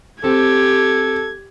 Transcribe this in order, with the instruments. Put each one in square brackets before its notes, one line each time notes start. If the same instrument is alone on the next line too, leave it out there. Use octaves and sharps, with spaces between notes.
[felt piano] C4 [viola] G4 [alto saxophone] A4 [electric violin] G#6